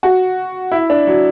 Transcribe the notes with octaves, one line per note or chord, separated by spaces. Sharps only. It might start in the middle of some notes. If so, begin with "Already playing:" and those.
F#4
E4
D4
F#3